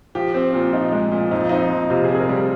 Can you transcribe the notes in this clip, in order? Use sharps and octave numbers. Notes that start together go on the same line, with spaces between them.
F3 G4
C4
A#2
F3 D#4
G#3
A#2
F2 D#4
C4 D#4
F2
C3 F4
G#4
C4
G#4
A#4
G3